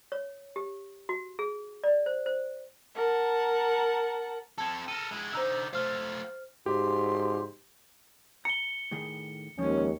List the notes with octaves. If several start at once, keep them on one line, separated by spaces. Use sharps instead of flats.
C#5
G4
F#4
G#4
D5
C5
C5
A#4 F#5 A5
C4 A4 A5 G#6
A4 A#4 D#7
G#3 E4
D3 D#4 C5 A#5 E6
A3 F4 C5 F6
G#2 F#4 G4 C6
A#5 C#7 G7
A2 D#3 G#4
D#2 F3 G#3 C#4